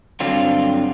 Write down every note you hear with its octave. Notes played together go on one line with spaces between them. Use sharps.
G2 D3 F#3 C4 F4